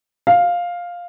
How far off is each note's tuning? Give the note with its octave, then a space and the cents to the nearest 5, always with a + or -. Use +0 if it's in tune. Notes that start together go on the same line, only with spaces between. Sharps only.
F5 +5